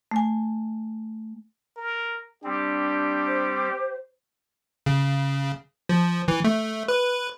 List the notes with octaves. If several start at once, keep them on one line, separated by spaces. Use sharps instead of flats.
A3 G#5
A#4
G3 C4 D4 G4
C5
C#3
F3
E3
A3
B4